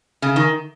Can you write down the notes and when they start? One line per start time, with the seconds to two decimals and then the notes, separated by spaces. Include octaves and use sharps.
0.22 C#3
0.36 D#3